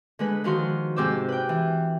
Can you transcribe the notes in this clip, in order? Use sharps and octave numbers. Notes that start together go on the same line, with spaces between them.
D3 G#3 B4
D#3 F3 F#4 C6
G#2 C3 C5 D6 E6
B4 G5
E3